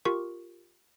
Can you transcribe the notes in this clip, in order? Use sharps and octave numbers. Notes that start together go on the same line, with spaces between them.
F4 G4 A#4 C#6